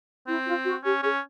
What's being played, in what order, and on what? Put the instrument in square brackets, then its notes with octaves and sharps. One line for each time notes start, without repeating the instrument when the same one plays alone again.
[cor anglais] C4 [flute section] E4
[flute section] F4
F#4
[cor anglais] C#4 [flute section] G4
[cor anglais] C#4 [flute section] G#4